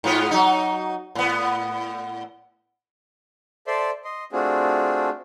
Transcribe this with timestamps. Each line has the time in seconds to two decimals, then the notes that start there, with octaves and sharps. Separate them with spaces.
0.04 G#2 B3 F4
0.31 F#3 D#4
1.15 A2 B3
3.67 A4 C5 D5 E5 C6
4.05 D#5 C6
4.33 A3 C4 D4 F4 F#4 G#4